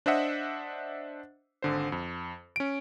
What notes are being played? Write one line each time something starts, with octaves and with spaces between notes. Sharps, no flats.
D4 C5 D#5 E5 F#5
G#1 D3 C5
F2
C#4 D7